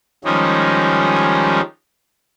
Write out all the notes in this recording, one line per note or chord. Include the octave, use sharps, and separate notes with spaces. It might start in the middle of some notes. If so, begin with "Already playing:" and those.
D#3 F3 G3 G#3 C#4 D#4